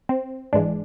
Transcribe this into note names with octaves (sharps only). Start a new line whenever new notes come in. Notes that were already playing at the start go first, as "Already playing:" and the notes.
C4
G#1 G#2 E3 G#3 D4